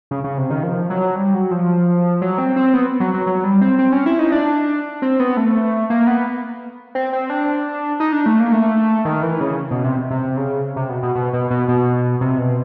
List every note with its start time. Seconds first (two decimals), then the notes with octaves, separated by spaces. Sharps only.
0.11 C#3
0.24 C#3
0.38 C3
0.50 D#3
0.63 F3
0.90 F#3
1.16 G3
1.34 F#3
1.51 F3
2.21 F#3
2.38 C4
2.56 C4
2.74 B3
3.00 F#3
3.14 F#3
3.27 F#3
3.44 G3
3.61 C4
3.79 C4
3.92 C#4
4.06 E4
4.19 D#4
4.32 D4
5.02 C4
5.20 B3
5.37 A3
5.90 A#3
6.07 B3
6.95 C4
7.13 C4
7.30 D4
8.00 D#4
8.13 D4
8.26 A3
8.40 A#3
8.52 A3
9.05 D#3
9.22 E3
9.41 C#3
9.71 B2
9.84 C3
10.10 C3
10.37 C#3
10.76 C3
10.89 B2
11.03 B2
11.15 B2
11.33 B2
11.51 B2
11.68 B2
12.21 C3
12.38 B2